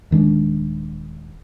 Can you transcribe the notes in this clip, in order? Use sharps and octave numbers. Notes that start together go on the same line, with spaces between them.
D#1 D#3 G#3 D4